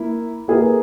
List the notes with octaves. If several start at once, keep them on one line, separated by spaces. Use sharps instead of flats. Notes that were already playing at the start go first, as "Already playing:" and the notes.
Already playing: A#3 E4
A#3 E4 G#4 B4